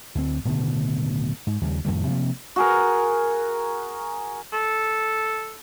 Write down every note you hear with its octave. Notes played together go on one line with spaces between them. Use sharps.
D2 C4
D1 B2 D3 D#3
G#2
D#2 C#3 G3
F2 A2 D#3 G3
C3 F3 A#3
F#4 G#4 A#4
A4